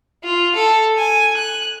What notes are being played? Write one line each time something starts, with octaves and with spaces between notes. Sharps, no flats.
F4
A4
G#5
F#6